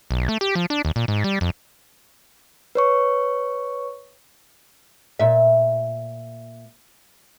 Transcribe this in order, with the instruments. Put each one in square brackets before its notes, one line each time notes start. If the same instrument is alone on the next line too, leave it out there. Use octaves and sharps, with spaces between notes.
[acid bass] B1
A3
G4
F3
D4
D#2
A#2
G#2
G3
F2
[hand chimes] B4 C#5 C#6
[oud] A#2 E5